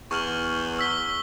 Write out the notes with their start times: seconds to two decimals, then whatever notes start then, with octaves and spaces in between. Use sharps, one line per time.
0.11 E2 C#6 F6 F#7
0.79 E6 B6 G7